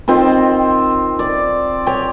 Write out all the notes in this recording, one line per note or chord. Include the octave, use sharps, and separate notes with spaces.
D#3 C4 F4 C5
D5
G4 C#5